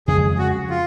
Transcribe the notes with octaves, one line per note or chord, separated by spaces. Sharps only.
F2 C#3 F3 G#3 G#4
F#4
F4